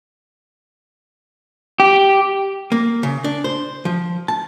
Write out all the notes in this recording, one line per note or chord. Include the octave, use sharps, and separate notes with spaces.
G4
A#3
C#3
D4
C5
F3
A5